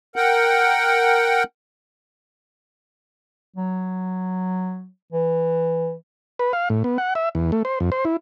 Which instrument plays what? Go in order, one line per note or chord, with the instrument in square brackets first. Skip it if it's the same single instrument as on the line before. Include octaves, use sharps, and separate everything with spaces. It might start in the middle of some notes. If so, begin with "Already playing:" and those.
[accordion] A#4 F#5 G5
[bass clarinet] F#3
E3
[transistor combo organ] B4
F5
A2
B3
F#5
E5
E2
A3
C5
F2
C5
E4